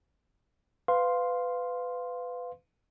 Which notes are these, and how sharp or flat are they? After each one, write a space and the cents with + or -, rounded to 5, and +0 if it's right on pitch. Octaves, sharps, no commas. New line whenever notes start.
B4 +25 F5 +5 C6 +0